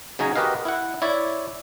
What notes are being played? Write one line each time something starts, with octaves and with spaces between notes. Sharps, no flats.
C#3 F#3 C#4 D#4 G#5 A#5
F#4 G4 A#4 B4 D#5 F5
E4 F#5
E4 C#5 D5 E5